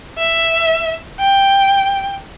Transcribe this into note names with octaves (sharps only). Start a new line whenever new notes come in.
E5
G5